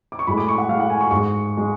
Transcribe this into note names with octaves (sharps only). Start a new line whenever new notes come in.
D6
C#6
A2 G#3 B5
D6
C#6
F#5
A2 G#3 F5
F#5
G#5
C#6
G#2 G#3 C#6
G#3